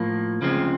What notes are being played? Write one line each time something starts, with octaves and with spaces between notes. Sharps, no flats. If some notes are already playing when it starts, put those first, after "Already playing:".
Already playing: A2 F3 A#3
D2 C#3 F3 G#3 C4